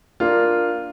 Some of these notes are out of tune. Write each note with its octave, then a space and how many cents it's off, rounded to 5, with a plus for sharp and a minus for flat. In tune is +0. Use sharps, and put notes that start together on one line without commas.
A#3 +0 D4 +0 F4 +0